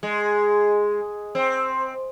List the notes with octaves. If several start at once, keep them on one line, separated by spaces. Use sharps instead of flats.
G#3
C4